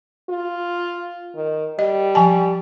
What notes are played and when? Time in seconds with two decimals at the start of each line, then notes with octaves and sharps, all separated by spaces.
0.29 F4
1.35 D#3
1.79 G3 D#5
2.15 F3 G#5 A5